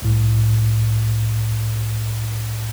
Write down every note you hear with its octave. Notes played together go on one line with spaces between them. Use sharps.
C2 A2